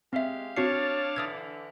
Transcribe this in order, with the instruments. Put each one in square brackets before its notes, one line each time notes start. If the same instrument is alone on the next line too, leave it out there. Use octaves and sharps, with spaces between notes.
[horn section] G#3 G4 F5 [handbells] C4 E5
[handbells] C4 F#4 C7 [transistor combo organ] D4 F5 A5 [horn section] C#5
[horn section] D3 E3 [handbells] D#6 E6 G#6